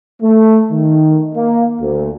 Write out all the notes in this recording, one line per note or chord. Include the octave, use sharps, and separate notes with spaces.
A3
D#3
A#3
D2